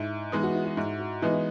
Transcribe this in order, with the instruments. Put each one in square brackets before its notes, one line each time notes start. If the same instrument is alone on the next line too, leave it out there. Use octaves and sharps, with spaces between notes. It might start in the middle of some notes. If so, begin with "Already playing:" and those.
Already playing: [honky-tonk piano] G#2 [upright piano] E4
[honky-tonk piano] E3 G#3 B3 D#4
[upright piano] F#4
E4
F#4
[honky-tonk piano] G#2 [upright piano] E4
[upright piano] F#4
[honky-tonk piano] E3 G#3 B3 D#4 [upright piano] E4
[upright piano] E4